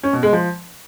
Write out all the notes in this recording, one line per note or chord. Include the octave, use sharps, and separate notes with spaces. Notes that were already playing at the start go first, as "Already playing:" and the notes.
C#4
B2
G#3
F3